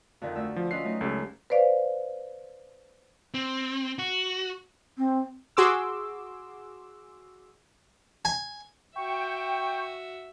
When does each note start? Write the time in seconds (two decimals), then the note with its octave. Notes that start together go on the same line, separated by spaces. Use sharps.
0.21 F2 D3 D#3
0.36 D2 E6
0.56 F3
0.71 C#4 F4 B4 D#5 C7
0.84 F#3 A3 D#4
1.01 C#2 C#4 G4 A4
1.50 B4 C5 D5 F5
3.34 C4
3.99 F#4
4.98 C4
5.57 F#4 G#4 C6 D6 E6
8.25 G#5
8.96 F#4 E5 G5 C#6